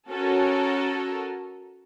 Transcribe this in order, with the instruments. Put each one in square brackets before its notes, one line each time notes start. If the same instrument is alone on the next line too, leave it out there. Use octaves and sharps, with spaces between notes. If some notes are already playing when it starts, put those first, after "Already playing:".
[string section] C#4 F#4 A4 A#4